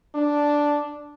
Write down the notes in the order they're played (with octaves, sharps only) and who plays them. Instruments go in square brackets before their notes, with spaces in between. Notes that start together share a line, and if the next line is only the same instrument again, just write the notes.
[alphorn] D4